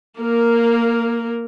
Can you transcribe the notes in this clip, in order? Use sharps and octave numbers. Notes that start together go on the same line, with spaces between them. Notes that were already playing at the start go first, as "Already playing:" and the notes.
A#3 A#4